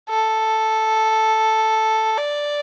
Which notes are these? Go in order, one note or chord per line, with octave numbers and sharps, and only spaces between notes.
A4
D5